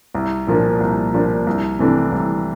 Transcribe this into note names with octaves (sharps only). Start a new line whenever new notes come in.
C2
A#2 F3 A#3 D4
C2
A#2 F3 A#3 D4
C2
C3 E3 A3 D4
C2